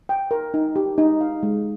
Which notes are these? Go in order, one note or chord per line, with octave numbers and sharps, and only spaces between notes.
G5
A#4
D#4
G4
D#4
F5
G#3